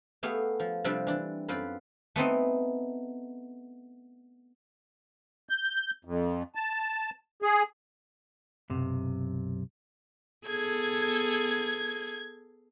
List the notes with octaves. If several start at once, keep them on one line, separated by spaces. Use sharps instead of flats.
A3 B3 G4 G#4 F5
F3
C3 F3 G3 C4 D4 G4
E3 D4
F#2 C4 F4 B4 C5 B5
A3 B3 C4 D#4
G6
F2
A5
G#4
B1 F#2 C3
B3 G#4 A4 G#6